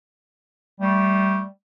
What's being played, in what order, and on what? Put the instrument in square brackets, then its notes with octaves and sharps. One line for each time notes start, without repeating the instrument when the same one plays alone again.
[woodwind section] G3 A3